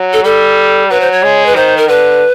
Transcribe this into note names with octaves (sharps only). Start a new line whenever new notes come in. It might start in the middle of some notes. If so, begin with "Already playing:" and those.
Already playing: F#3
A4
G3 A4
F#3 B4
C5
C#5
G#3
B4
D#3 C5
A#4
D3 B4